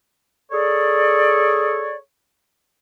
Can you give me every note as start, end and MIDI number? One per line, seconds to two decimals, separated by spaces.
0.51 1.97 68
0.51 1.97 69
0.51 1.97 73
0.51 1.97 74